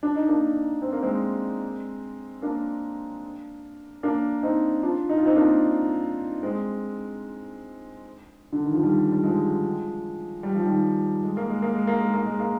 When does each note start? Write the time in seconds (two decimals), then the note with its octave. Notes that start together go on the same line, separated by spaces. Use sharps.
0.03 D4
0.16 D#4
0.29 A#3 D4
0.82 C4
0.93 A#3
1.03 G#3 C4
2.42 A#3 D4
4.03 A#3 D4
4.43 C4 D#4
4.83 D4 F4
5.09 D#4
5.17 F4
5.26 C4 D#4
5.36 A#3 D4
6.43 G#3 C4
8.52 D3
8.63 D#3
8.73 F3
8.83 D#3 G3
9.12 G3
9.23 F3 G#3
10.43 G3
10.55 F3
10.65 D#3 G3
11.24 G#3
11.37 A#3
11.50 G#3
11.62 A#3
11.75 G#3
11.87 A#3
12.01 G#3
12.14 A#3
12.26 G#3
12.40 A#3